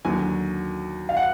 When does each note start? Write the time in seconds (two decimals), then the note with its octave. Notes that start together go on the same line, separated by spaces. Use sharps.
0.05 D#2 D3 F#3 D4 G#5
1.09 F5
1.17 F#5